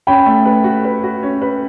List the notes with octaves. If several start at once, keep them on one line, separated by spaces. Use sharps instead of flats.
C#4 G5 B5
A3
B4
F#4
B4
F#4
C#4
B4